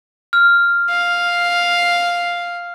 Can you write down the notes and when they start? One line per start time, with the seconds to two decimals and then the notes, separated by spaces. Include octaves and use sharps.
0.33 F6
0.90 F5